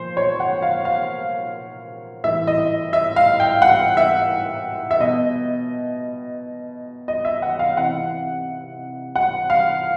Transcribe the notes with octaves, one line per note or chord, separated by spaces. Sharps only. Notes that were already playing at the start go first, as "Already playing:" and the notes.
Already playing: A#2 F3 C5
C#5
F#5
F5
F5
A2 E3 E5
D#5
E5
F5
G5
F#5
E5
E5
B2 D#5
D#5
E5
F#5
F5
C3 E3 F#5
F#5
F5